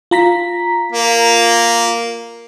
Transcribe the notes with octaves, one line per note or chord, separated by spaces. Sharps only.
F4 A#5 B6
A#3